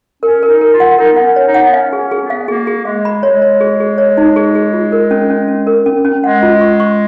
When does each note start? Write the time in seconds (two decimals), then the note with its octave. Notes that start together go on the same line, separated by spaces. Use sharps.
0.23 C#4 A#4
0.43 A#4
0.48 D#4
0.61 A#4
0.74 F4
0.80 F#5
0.99 D#4 A#4
1.13 B3 F#5
1.23 C#4
1.36 C#5
1.48 D#4
1.54 F#5
1.63 B3
1.73 C#4 F5
1.93 G#4
1.98 C#4
2.11 G#4
2.23 B3
2.30 F5
2.48 A#3 G#4
2.67 G#4
2.85 G#3 F5
3.05 B5
3.23 G#3 C#5
3.42 C#5
3.61 G#4
3.80 G#4
3.98 C#5
4.18 D#4
4.36 G#4
4.55 G#4
4.73 F4
4.92 A#4
5.11 C#4
5.30 C#4
5.48 C#4
5.67 A#4
5.86 C#4
6.05 C#4
6.24 G#3 F#5
6.43 F4
6.61 C#6
6.80 C#6